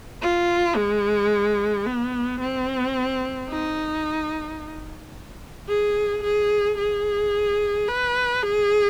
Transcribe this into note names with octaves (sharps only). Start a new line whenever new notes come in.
F4
G#3
B3
C4
D#4
G#4
G#4
G#4
B4
G#4